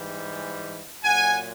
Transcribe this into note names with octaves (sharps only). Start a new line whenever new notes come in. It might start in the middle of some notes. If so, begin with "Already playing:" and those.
Already playing: G#2 E3 G3
A#2 F#3 F#5 G#5